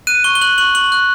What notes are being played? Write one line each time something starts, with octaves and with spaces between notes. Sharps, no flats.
F#6 D#7
C#6 G7
G7
F#6 F#7
C#6 F#7
C#6 F#7
F#6